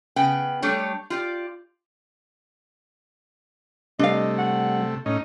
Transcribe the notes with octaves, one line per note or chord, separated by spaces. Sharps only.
C#3 B3 G5
G3 A3 D4 G4 A4 C#5
F4 G4 D5
C3 G3 A3 D4 D#5 F5
F#5
A2 C#4 D#4 D#5